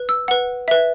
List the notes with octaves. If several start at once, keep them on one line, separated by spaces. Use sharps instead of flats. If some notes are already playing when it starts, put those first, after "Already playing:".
Already playing: B4
E6
B4 F#5
B4 E5